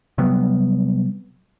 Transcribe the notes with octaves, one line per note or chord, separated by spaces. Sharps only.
C3 F#3 G3 B3